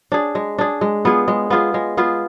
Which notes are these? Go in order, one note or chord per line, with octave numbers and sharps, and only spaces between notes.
D4 G#4
G#3
D4 G#4
G#3
B3 F4 G#4
G#3
B3 F4 G#4
G#3
B3 F4 G#4